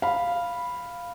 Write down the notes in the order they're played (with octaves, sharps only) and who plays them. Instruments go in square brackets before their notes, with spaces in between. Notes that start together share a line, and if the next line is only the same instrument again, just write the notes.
[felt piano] F5 B5